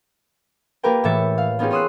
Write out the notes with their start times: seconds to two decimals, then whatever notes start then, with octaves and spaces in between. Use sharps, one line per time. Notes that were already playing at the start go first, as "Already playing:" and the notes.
0.83 A#3 F4 G4 A#4 B4 G5
1.04 A2 E3 E5 A6 C#7
1.38 F5
1.59 B3 C#4 D#4 F4 G4 G#4
1.71 C#5 C6 D#6 E6 F#6